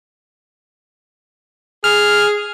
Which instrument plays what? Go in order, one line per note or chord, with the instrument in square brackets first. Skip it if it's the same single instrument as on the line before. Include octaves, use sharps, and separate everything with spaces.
[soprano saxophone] G#4 [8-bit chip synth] F6